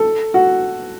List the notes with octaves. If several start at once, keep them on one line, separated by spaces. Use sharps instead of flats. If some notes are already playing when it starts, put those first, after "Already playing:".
Already playing: A4
F#4